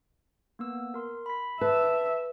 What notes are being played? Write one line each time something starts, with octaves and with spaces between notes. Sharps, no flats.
A#3 B3 E6
A#4 C6
B5 B6
B4 E5 A5